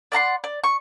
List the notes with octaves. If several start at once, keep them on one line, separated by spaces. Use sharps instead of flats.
D5 F#5 A#5 C6
D5
C#6